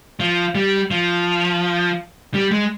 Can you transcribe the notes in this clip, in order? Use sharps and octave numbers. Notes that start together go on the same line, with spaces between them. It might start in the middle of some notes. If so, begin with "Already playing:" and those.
F3
G3
F3
G3
G#3